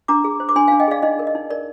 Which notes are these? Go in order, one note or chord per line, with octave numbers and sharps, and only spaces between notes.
D4 A#5 D6
G#4
C5
D6
D4 G#5 C6
F5 G#5
D4
D#5 G5
G#4 D5 F5
D#4 D#5
A#4
D#5
D#4
A#4 D5